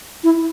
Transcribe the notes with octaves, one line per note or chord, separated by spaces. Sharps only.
E4